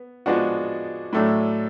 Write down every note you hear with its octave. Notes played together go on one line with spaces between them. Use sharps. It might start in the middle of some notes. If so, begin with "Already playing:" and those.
Already playing: B3
F3 G#3 B3 D4 F#4
A2 F#3 A3 D4